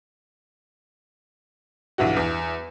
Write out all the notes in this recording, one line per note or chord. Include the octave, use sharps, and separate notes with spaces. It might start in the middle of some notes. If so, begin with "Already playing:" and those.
B1 G2 E3 F#4
E2